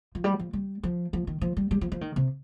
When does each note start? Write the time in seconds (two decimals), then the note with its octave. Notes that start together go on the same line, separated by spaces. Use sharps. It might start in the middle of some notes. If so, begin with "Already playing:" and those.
0.15 F3
0.24 G3
0.39 F3
0.53 G3
0.83 F3
1.13 F3
1.27 D#3
1.41 F3
1.57 G3
1.71 G3
1.81 F3
1.92 F3
2.01 D#3
2.16 C3